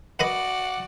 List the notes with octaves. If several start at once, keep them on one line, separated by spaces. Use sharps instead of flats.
F#4 B4 D5 D#5 F#5 B5